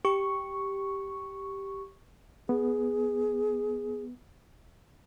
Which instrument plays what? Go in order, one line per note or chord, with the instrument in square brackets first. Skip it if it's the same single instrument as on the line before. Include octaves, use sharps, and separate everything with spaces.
[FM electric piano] G4 C#6
[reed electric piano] B3 [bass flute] G#4